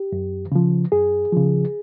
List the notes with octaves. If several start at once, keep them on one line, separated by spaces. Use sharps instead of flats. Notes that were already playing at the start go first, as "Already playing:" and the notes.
Already playing: G4
F#2
C#3 F3
F#2 G#4
C#3 F3